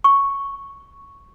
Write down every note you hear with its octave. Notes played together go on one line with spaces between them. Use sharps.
C#6